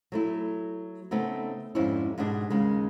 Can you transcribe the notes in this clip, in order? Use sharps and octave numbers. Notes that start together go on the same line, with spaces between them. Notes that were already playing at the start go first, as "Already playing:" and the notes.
F#3 A3 E4
C#3 A3 B3 C4 D#4
F2 G#2 G3 C4 C#4 E4
G#2 B2 G3 D4 G#4
D#2 C#3 G#3